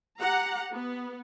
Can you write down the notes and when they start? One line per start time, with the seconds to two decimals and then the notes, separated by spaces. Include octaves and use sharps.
0.20 G4 F#5 A#5
0.72 B3